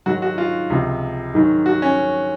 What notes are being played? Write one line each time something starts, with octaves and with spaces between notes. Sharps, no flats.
G#2 D#3 F#3 F#4
F#4
F4
C#2 C3 F3
G#2 D#3 F#3
F#4
C#4